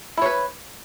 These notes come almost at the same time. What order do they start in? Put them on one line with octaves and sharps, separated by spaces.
E4 C#5 B4